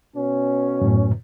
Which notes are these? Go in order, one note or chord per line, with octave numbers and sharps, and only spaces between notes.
B2 C#4
F#2 A2